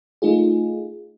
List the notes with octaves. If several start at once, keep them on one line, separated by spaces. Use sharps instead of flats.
A3 D#4 F4 G#4